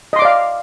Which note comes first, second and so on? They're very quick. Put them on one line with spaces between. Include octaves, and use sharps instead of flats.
D#5 C6 D6 D5 F5